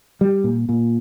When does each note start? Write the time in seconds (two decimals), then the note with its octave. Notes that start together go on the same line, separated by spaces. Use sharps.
0.21 G3
0.44 A#2
0.69 A#2